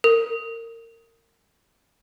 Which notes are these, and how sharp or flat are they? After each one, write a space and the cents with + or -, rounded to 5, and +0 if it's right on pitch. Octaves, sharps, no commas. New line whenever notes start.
A#4 -30